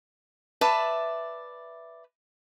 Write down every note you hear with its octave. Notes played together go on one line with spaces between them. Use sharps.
B4 D5 E5 A5